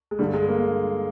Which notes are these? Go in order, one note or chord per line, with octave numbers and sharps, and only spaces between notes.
G#3
G2 D3 G3
G#3
A#3